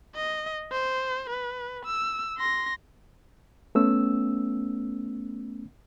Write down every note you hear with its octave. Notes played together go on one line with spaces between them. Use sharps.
D#5
C5
B4
E6
C6 A#6
A3 B3 C#4 E6